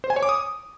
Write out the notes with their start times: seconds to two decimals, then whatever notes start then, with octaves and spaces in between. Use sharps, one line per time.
0.04 C5
0.10 G#5
0.16 C#5
0.23 D6
0.29 D#6